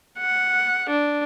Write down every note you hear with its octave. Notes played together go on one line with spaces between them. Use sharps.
F#5
D4